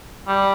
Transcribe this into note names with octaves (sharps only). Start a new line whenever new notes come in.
G3